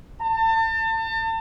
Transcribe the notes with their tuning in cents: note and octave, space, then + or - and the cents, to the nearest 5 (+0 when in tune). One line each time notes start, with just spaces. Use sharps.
A5 +35